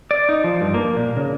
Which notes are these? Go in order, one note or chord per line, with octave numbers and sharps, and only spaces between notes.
D5
D#4
F3
G2
A#3
A#2
C#3